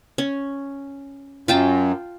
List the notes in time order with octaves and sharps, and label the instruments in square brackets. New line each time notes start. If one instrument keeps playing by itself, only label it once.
[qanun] C#4
[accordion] F#2 [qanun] F4 G5 A5